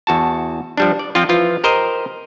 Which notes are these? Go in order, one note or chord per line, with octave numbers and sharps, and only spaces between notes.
E2 F#4 A5
F3 G3 D4
D5
F3 C4 F4
E3 F3 F4
G4 A#4 C5 D#5